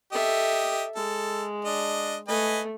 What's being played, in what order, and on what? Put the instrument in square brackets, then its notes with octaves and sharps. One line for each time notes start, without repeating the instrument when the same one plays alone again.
[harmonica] G4 D#5 [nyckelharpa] A4 E5
[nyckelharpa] G#3 [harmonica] A4
[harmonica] D4 D#5
[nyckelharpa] A3 [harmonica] B4 D#5 G#5